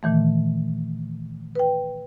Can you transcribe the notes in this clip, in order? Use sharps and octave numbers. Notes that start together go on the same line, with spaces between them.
A#2 D#3 E3 A3
B4 G5